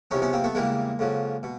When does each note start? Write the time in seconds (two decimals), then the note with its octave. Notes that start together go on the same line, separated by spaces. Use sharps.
0.11 E2 C3 F3 C#4 D#4
0.22 B3 C#4
0.33 A#3 C4
0.44 A3 B3
0.55 E2 C#3 E3 G3 G#3 A#3
0.99 F2 C#3 F#3
1.43 B2